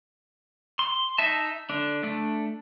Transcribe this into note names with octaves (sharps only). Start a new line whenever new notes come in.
C6
D#4 E5 A5
D3 D4
A3 D4